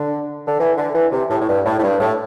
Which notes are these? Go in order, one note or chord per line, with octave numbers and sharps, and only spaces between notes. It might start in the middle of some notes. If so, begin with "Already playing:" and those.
Already playing: D3
D3
E3
D3
E3
C3
A2
A2
G2
A2
A2
G2
A2